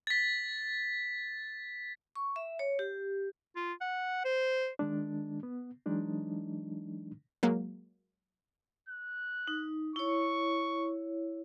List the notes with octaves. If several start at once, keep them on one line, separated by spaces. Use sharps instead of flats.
A6 B6
C#6
E5
C#5
G4
F4
F#5
C5
D#3 G#3 D4
B3
E3 F#3 G#3 D4 D#4
F#3 G#3 A#3
F#6
D#4
E4 C#5 C#6